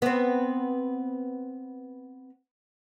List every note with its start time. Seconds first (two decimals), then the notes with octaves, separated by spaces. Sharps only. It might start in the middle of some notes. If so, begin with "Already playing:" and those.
0.02 B3 C4